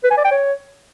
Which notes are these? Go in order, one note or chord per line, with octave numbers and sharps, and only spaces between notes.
B4
G#5
D5
G5
C#5